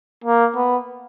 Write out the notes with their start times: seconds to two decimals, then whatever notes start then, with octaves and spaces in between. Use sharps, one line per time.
0.24 A#3
0.55 B3